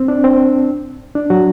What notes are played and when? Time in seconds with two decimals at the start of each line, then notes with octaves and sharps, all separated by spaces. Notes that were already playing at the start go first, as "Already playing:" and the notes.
Already playing: C4
0.08 D4
0.24 C4
1.15 D4
1.30 F#3 F#4